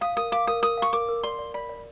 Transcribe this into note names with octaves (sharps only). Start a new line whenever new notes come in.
F5 D#6
A#4 D#6
F5 D6
A#4 D#6
A#4 D#6
F5 C#6
A#4 D6
A#4
D5 C6
D5
D5 B5
D5